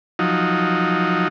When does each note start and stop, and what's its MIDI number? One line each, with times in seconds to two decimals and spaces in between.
0.19 1.28 53
0.19 1.28 54
0.19 1.28 63